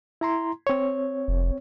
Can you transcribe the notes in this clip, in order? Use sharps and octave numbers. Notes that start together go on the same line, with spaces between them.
E4 A#5 C6
C4 C#5
F1